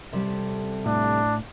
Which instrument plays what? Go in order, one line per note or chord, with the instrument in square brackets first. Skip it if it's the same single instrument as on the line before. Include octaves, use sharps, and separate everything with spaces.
[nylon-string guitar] C3 G3 A4
[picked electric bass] A2 [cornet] D4